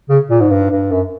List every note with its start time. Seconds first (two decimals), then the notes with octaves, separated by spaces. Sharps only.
0.09 C#3
0.30 A#2
0.40 G#2
0.51 G2
0.71 G2
0.92 F#2